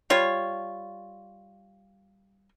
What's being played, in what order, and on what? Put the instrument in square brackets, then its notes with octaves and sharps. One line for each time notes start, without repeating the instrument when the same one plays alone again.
[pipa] G3 F4 C#5